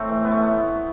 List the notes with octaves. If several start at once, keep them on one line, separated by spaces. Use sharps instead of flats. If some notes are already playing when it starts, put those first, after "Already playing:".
Already playing: A2 A3 C4
E3
E3 B3
A3
A2